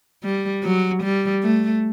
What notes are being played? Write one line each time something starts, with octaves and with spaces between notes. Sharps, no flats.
G3
F#3
G3
A3